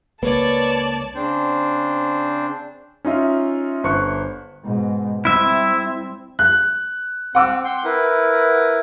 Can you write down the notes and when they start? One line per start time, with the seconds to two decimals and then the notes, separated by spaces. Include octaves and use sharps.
0.23 C#2 A#3 B4 C#5 D5 A5
1.15 C#3 C4 D4 C5
3.05 C#4 D#4 F4 E5
3.84 G1 C5 C#6 F#6 C#7
4.63 G#2 B2
5.25 G3 C4 E4 E5
6.39 F#6
7.35 C4 F#5 D6 E6
7.65 G5 C6
7.84 E4 A#4 B4